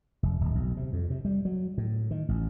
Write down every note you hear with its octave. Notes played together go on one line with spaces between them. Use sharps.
F1
D1
B1
C3
F2
C3
G3
F#3
A2
D#3
A1